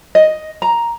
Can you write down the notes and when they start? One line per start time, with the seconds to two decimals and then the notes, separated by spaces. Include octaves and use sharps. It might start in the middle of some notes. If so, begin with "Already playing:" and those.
0.15 D#5
0.62 A#5